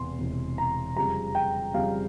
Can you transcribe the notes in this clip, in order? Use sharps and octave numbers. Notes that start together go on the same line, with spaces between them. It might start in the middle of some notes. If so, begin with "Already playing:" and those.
Already playing: E1 E2 C3 C6
E1 E2 C3
A#5
F2 C#3 G3 C4 A#5
G5
F2 C#3 G3 C4 F5